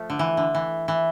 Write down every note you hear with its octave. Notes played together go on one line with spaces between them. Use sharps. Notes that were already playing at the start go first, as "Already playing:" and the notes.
Already playing: F3 A3
D3
E3
D3
E3
E3